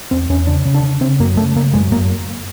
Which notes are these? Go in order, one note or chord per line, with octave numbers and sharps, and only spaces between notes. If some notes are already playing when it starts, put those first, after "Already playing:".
E2 C4
E2 C#4
C#3 D4
C#3
D4
C#3
C#3 C4
F#2 A#3
C#3 A3
C#3 A#3
F#2 G#3
F#2 A#3